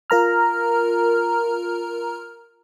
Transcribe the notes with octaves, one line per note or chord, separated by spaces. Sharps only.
F4 A#4 A#5 F6